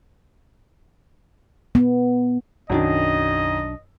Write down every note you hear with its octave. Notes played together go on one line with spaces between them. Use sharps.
B3
B1 F#2 D#3 F#3 D4 D#5